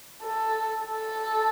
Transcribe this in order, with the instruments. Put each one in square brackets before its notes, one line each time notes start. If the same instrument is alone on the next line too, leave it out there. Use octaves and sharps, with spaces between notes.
[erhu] A4
A4